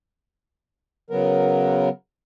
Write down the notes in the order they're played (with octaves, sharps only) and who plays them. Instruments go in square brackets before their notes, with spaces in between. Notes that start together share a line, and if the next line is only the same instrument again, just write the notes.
[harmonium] C#3 F#3 B3 A#4